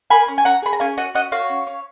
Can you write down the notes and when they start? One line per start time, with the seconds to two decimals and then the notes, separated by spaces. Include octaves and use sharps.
0.10 A#3 G#5 B5
0.28 C#4
0.38 G#5
0.45 C#4 F#5 A#5
0.62 G#4 B5
0.73 A#5
0.80 C#4 F5 G#5
0.97 F#4 D#5 F#5
1.15 C#4 D#5 F#5
1.32 F#4 C#5 F5
1.49 C#4
1.67 C#4